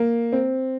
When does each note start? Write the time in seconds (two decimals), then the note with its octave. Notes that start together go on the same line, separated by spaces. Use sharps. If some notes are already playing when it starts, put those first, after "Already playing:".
Already playing: A#3
0.33 C4